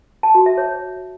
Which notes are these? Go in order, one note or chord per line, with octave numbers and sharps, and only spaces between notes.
A5
F#4
E5
C#5